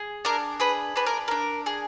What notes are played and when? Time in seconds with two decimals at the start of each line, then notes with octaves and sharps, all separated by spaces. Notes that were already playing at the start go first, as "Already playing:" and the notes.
Already playing: G#4
0.25 D4 A#4
0.60 G#4 B4
0.96 D4 B4
1.06 A#4
1.28 D4 A#4
1.66 G#4